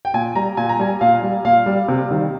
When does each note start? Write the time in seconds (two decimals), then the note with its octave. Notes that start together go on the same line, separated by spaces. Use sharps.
0.05 G5
0.14 A#2 G#5
0.35 G3 A#5
0.57 A#2 G#5
0.69 A#5
0.79 G3 G#5
1.01 A#2 F5
1.23 G3
1.45 A#2 F5
1.66 G3
1.88 C3
2.11 D#3 G3